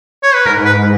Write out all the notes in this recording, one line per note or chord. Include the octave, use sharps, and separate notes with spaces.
C#5
B4
G#2 A#4
B4